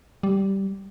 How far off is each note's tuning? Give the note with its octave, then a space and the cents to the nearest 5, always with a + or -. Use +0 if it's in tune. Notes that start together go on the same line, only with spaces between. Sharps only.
G3 -10